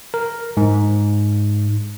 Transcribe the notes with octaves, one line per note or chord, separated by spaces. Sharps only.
A#4
G#2